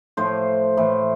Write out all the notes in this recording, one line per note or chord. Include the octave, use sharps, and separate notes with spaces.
A2 F3 C5
A2 E3